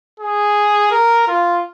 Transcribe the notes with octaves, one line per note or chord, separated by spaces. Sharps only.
G#4
A#4
F4